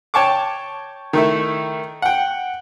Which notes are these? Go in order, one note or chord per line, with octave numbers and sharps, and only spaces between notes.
C#5 G5 A5 C#6 D6
D#3 A3 E4
F#5 G5